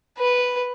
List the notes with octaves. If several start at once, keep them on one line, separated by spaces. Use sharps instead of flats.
B4